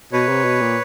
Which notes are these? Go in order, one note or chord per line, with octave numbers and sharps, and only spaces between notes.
B2 B4 C#5
C3
B2
A#2